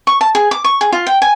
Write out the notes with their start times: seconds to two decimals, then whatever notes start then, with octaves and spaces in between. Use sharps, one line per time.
0.07 C#6
0.21 A5
0.35 G#4
0.51 D6
0.64 C#6
0.81 G#4
0.92 F4
1.06 G5
1.22 G#5